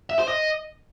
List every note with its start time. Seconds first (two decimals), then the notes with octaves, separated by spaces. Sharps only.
0.10 E5
0.19 C5
0.28 D#5